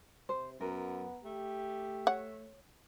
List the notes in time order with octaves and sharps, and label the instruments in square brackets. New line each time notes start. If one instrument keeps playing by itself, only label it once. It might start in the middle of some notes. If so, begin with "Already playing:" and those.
[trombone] C3 [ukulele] C5
[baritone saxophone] F#2 [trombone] B3 [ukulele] A#4
[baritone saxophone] A3 [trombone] G4
[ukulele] C#5 [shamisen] F#5